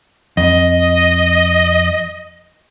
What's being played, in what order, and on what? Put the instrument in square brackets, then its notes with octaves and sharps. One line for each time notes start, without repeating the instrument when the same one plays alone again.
[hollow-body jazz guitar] F2 [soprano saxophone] D#5